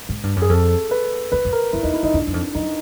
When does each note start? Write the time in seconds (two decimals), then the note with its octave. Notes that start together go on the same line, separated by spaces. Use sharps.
0.09 G#2
0.23 G2
0.36 F#2
0.42 G#4
0.49 F2 A4
0.91 B4
1.32 E2 B4
1.45 F2
1.53 A#4
1.73 F2 E4
1.83 E2 D#4
1.93 E4
2.03 F2 D#4
2.13 E2 D4
2.27 F#2
2.34 F2
2.55 F#2 D#4